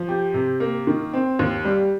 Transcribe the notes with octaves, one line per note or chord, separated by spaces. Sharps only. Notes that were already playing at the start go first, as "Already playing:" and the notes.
Already playing: F3
G4
C3
A#3
D#3
C4
D#2
G3